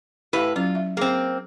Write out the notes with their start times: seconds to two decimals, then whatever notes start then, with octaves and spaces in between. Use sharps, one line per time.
0.33 A2 E4 G4 B4 F5
0.56 F#3 C#4 F4
0.75 E5
0.97 A#3 C4 G#4